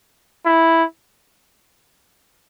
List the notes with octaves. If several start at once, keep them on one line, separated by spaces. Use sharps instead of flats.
E4